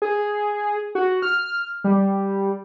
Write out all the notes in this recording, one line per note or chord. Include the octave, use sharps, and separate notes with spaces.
G#4
F#4
F6
G3